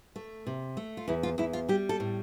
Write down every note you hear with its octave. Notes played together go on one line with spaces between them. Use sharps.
A3
C3
A3
F4
E2 E4
F4
E2 E4
F4
G3 G4
A4
A2